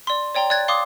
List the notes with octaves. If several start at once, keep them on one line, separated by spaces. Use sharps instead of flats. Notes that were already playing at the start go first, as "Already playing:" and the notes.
D5 C6
C#5 D5 G5 A#5 C6
D5 F#6 G#6 A6
F5 C6 D6 D#6